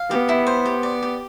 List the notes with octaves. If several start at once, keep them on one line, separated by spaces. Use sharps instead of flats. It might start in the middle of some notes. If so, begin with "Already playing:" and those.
Already playing: F5
B3 G4
E4
C5
G4
D5
G4